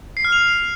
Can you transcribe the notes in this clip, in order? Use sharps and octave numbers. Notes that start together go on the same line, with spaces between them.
C7
F6
F7